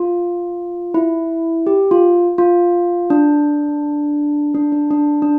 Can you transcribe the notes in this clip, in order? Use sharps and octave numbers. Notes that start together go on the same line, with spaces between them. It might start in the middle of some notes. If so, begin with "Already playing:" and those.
Already playing: F4
E4
G4
F4
F4
D4
D4
D4
D4
D4